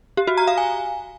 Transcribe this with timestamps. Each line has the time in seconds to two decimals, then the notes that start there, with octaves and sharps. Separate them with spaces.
0.17 G4
0.27 F#4
0.37 A#5
0.47 F5
0.58 G#5